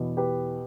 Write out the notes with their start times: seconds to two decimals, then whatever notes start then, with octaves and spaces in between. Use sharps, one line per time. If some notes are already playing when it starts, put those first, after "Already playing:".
Already playing: E2 B2 B3
0.17 G4 B4